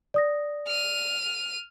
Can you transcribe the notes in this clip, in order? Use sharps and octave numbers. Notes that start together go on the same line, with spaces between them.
D5 D#6 A#6
F6 D#7